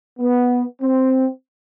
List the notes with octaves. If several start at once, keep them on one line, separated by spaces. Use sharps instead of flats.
B3
C4